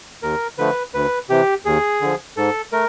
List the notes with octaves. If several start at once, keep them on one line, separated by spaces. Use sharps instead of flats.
D#2 A#4
D3 F3 A3 B4
D2 B4
C3 E3 G4
D#2 G#4
D3 F3
G#2 A4
A3 A#4